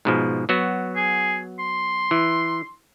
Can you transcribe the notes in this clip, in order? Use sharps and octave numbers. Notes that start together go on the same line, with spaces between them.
G#2 B2 F3
F#3 B3 F#4
G#4
C6
E3